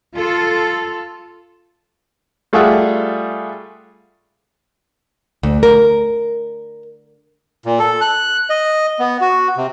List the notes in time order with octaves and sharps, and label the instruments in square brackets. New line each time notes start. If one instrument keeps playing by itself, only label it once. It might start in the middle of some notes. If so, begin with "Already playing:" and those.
[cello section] F4 A4
[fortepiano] G3 A3 F4 G#4 E5 F#5
[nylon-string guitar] D2
A#4
[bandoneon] A#2
A4
F#6
D#5
B3
F#4
C3